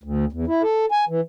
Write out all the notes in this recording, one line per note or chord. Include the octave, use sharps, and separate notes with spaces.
D2
E2
E4
A4
G#5
E3